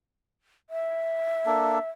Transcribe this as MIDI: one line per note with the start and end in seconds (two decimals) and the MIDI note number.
0.70 1.89 76
1.46 1.79 58
1.46 1.79 62
1.46 1.79 69